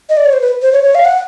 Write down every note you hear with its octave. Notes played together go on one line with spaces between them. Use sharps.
D#5
D5
C#5
C5
B4
C5
C#5
C#5
F5
F#5